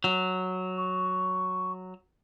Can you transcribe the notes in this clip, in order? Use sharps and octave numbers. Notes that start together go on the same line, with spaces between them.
F#3
C#6